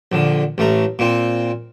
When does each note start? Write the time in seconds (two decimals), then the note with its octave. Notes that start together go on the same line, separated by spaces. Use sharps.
0.12 A#1 D3
0.58 A1 A3 A#5
0.99 A#2 C4